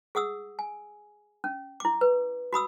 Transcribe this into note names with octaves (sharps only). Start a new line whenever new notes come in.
G#4 F#5 D#6 E6
G#5
C#4
E4 D6
B4
F#4 B5 D#6 E6